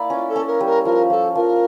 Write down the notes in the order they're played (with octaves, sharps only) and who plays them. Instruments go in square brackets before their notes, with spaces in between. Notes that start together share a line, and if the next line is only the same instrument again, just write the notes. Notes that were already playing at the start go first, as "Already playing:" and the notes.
Already playing: [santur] A#3 E4 D5
[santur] C#4 [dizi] F4
[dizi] A4
[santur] C#4
[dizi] A#4
[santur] G3
[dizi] A#4
[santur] F3 [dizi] A#4
[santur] F3 [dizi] A4
[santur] F3 [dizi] A#4